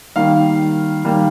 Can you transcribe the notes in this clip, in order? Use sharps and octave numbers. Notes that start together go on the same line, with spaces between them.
D#3 G3 A#3 F5
D#3 G3 A#3